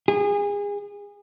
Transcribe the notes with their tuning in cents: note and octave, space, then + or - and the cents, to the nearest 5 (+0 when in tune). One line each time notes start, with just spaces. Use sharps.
G#4 -30